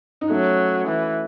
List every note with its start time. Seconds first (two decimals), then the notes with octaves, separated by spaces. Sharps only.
0.21 D#4
0.30 F#3 A3 C#4
0.87 E3